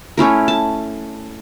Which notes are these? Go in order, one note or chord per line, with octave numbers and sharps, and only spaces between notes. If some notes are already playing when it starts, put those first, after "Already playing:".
A3 C#4 E4 A#4
A5